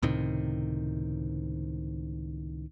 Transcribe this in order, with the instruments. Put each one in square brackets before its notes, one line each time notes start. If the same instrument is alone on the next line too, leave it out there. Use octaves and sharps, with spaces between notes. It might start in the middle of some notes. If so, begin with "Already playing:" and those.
[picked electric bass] C#2 A2 C3 D#3